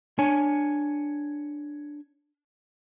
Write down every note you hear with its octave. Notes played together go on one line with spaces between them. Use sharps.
D4 C#5 G#5